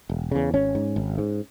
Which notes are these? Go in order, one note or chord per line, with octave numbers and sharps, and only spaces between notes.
E1
E2 C#3
G#1 C#4
G#2
G#1
G#2